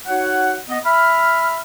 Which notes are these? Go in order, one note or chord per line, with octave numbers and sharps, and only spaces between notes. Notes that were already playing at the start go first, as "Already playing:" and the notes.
D#4 F#4 C#5 F#5
B3 D#5
E5 B5 F6